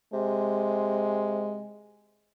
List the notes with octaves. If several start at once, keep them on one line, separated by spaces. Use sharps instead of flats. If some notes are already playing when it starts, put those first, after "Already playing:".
C3 G#3